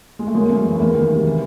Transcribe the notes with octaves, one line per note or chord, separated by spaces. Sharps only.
G#3
A3
F#2 G#3 A#3
F#2 A3
E3
A3
E2 G#3 A#3
D#3
C3
E3